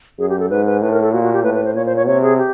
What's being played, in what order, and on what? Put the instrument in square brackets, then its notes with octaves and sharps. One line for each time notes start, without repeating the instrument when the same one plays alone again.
[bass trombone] F#2 [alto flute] G#4
[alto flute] G4
A4
[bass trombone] G#2 [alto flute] B4
[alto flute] B4
[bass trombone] A2 [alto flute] B4
[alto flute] A#4
A4
[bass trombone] A#2 [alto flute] F#4
[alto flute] F#4
G4
[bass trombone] A2 [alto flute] B4
[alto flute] B4
C5
[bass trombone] A#2 [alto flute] C#5
[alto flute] C5
C#5
[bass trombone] C3 [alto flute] C#5
[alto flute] G#4
G4